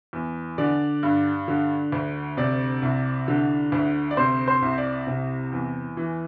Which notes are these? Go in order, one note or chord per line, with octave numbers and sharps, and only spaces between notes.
E2
D3 D5
G2
D3
D2
C3 D5
C2
D3
D2
D5
C3 C5
C5
C2
D5
C3
E2
E3